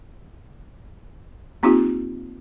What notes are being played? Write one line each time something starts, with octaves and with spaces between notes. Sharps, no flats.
A#3 C4 D#4 F4 G4